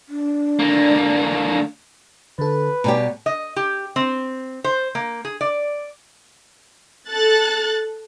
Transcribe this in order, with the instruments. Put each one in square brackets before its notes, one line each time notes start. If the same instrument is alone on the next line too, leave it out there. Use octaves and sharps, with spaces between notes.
[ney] D4
[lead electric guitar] D3 A#3
[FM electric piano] D3 A4 [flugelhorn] B4
[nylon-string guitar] B2 G3 G4 [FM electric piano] C#5 G#5 A#5
[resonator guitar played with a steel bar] D#5
G4
C4
C5
A#3
G#4
D5
[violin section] A4 F#6 A6